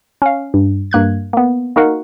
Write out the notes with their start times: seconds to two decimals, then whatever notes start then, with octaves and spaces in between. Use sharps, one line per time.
0.22 C#4 F5
0.54 G2
0.91 G2 A#3 F#6 G#6
1.33 A#3 B3
1.76 A#3 D#4 F#4 A#4 F5 F#5